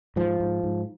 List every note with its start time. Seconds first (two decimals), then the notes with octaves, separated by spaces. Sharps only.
0.16 G#2 F3
0.40 G#2
0.63 G#2